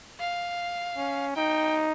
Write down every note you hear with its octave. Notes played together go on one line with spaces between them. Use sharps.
F5
C#4
D#4 G5